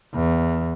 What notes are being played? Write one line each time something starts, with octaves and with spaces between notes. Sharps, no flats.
E2